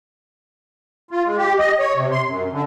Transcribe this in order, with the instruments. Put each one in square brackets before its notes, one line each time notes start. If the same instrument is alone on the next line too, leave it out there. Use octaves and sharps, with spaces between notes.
[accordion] F4
G#3
G4
D#5
C#5
C3
C6
F#2
D3